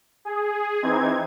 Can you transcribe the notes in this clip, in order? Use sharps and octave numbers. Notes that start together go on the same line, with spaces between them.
G#4
E3 C4 D#4 G#6